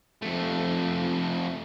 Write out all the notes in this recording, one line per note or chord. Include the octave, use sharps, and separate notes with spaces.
F2 A3